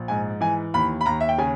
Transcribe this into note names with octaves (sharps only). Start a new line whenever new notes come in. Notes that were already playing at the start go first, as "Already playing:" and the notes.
Already playing: A#1
G#2 G#5
E3 G#5
D#2 B5
B5
D#2 A#5
E5
G5
C#3 G#5